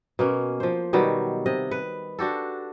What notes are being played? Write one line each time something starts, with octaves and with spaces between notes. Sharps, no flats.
B2 A#3 C#4
F3 C5
B2 D#3 F#3 G3
C3 D#5
B4
D4 F#4 G4 A4